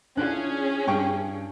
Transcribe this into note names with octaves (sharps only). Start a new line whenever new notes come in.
C#4 D4 E4 F4 G#4 F#6
G2 G5 C#6